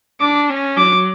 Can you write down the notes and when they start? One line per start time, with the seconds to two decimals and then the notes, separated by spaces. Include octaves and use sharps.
0.21 D4 D6
0.49 C#4
0.77 F#3 D6